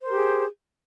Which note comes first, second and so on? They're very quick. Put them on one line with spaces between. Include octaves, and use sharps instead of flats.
C5 A#4 G4 G#4